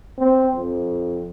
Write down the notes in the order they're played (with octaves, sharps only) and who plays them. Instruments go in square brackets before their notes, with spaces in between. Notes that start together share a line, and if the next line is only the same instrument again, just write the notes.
[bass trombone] C4
F2